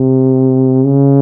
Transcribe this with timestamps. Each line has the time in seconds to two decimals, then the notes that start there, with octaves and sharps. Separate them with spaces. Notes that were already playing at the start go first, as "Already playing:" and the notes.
Already playing: C3
0.84 C#3